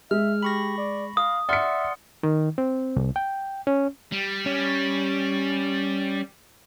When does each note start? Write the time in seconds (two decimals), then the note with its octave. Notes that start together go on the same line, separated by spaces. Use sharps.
0.11 G#3 E5 F6
0.43 G4 B5 C#6 A#6
0.78 D5
1.17 F5 D#6
1.49 D5 E5 F#5 C6 F6 C#7
2.23 D#3
2.58 C4
2.96 C2
3.16 G5
3.67 C#4
4.12 G3
4.46 C#4